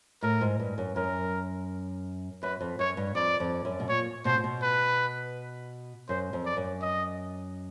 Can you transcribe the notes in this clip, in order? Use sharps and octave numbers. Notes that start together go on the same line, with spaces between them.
A2 A#4
G#2
G2
F#2
F#2 A#4
F#2 B4
F2
F#2 C#5
G2
F2 D5
F2
F#2
B2
A#2 C#5
B2 C5
A#2
B2
B4
F#2 C5
F2
D5
F#2
D#5